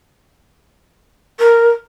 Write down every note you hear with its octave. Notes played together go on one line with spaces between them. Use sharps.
A#4